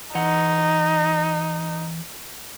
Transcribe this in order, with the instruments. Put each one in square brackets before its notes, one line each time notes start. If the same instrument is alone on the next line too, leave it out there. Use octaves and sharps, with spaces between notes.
[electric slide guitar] E3 F#5 [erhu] D#4